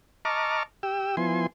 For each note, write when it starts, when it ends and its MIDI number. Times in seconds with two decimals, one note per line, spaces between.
0.25 0.63 75
0.25 0.63 81
0.25 0.63 82
0.25 0.63 85
0.25 0.63 86
0.25 0.63 89
0.83 1.16 67
0.83 1.16 79
0.83 1.16 88
1.17 1.47 53
1.17 1.47 59
1.17 1.47 64
1.17 1.47 80
1.17 1.47 84